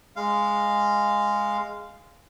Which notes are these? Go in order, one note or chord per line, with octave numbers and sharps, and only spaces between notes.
G#3 F5